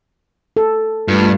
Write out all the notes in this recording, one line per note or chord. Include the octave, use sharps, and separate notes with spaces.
A4
G2 A3 F4